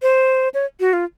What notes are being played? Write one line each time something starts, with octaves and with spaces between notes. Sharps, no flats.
C5
C#5
F#4
F4